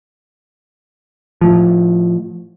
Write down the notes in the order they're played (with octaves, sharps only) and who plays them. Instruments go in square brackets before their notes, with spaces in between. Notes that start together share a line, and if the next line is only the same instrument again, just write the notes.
[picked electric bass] A2 F3